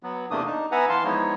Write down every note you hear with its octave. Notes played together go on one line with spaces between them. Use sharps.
F#3 B3
E2 C3 A3 A#3 D4 D#6
D4 D#4
B3 B4 E5 F#5 G#5 A#5
E3 F5 A5 C6
F3 G#3 B3 D#4 E4 C#5